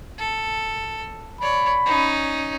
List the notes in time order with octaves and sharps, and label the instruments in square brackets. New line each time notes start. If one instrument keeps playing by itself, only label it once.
[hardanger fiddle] A4
[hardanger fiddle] C#5 D5 [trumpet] B5
[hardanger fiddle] C#4 D#4